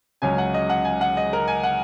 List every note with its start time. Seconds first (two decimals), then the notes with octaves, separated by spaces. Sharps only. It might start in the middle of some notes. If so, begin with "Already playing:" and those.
0.22 C#2 C#3 F#3 C#4 G#5
0.38 F#5
0.54 D#5
0.70 F#5
0.85 G#5
1.01 F#5
1.17 D#5
1.33 A#4
1.48 G#5
1.63 F#5